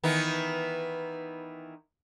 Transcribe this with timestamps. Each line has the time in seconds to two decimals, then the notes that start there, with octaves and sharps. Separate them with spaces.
0.04 D#3 E3 B3